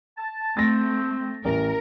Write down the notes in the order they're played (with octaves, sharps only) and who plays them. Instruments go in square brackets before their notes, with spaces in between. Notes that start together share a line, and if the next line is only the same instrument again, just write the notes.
[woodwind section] A5
[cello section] A3 [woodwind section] C4 [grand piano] A6 A#6
[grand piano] A1 [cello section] A#4